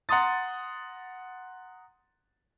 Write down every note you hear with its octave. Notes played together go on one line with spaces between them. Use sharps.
F#5 A#5 C6 D#6 A6